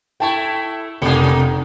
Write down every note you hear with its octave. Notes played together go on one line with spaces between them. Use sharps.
A3 E4 G5 A5 C#6
F1 C3 A#3 D#4 C#7